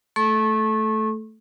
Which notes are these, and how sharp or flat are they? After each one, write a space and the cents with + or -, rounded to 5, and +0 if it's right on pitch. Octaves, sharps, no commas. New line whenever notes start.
A3 +0 A4 -20 C#6 -30